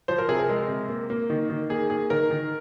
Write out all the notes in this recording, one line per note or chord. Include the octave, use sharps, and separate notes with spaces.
F3 C5
A#4
C3 G#4
A#4
G#3
C3
A#3
A#3
D#3
D#3
A#3 G#4
A#3 G#4
D#3 A#4
D#3